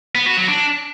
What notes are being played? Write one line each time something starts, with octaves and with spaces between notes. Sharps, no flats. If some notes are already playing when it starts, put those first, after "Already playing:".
B3
F#4
F#3
D4